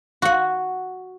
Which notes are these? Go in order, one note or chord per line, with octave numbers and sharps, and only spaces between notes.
F#4 F#5